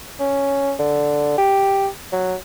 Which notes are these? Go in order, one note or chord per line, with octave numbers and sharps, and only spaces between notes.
C#4
D3
G4
F#3